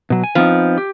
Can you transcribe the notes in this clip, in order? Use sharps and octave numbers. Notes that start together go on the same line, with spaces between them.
B2 F#3
G#5
F3 B3 C4 D#4
G4